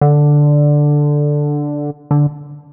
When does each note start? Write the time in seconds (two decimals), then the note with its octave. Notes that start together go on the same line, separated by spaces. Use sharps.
0.01 D3
2.11 D3